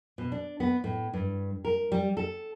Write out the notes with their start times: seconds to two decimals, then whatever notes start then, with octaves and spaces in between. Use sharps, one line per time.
0.18 B2
0.32 D4
0.60 B3
0.84 A2
1.14 G2
1.65 A#4
1.92 G3
2.17 A4